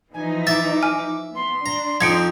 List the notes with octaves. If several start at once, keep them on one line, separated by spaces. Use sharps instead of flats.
E3 F3 D#4 G#5
E5 D6 A6
G#5 F6
B3 C6
D4 A#5
F2 F3 D#4 G#6 C#7 D7